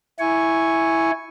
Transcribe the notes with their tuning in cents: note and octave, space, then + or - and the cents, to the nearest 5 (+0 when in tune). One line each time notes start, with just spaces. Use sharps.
E4 +0 G#5 +0 C#6 +0